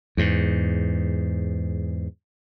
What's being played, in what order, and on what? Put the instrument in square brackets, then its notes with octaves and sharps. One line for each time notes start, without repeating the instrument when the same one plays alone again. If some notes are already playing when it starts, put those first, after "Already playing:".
[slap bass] E2 G#2